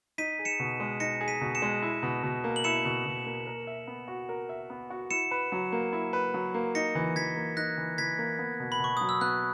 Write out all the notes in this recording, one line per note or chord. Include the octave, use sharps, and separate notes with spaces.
D#4 B6 D#7
G#4
C#7 E7
B2
G#3
D#4 A#6 C#7
G#4
B6 D#7
B2
C#7 E7
G#3
E4
B2
B2
A#3
F#7
E4 C#7 E7
B2
B2
A#3
A#4
E5
B3
F#4
A#4
E5
B3
F#4
E4 C#7 E7
B4
F#3
A#3
E4
B4
F#3
A#3
D#4 A#6 C#7
E3
E3 G#6 B6
A#3
D#4 F#6 A#6
E3
E3 G#6 B6
A#3
B3
B2
B5
B2 C#6
F#3 D#6
E6
B3 F#6